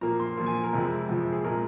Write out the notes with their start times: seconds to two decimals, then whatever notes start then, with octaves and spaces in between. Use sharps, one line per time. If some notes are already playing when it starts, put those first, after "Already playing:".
0.01 A#2 F3 A#3 A#5
0.20 C6
0.37 A#2 F3 A#3
0.46 G#5
0.64 A#4
0.73 F2 C3 F3 G#3
1.09 F2 C3 F3 G#3
1.32 G#4
1.44 A#2 G#3 A#4